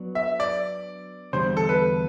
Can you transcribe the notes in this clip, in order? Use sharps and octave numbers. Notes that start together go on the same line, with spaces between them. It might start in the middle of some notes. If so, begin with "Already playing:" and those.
Already playing: F#3 B3 D4
E5
D5
E2 D3 G3 C5
A4
B4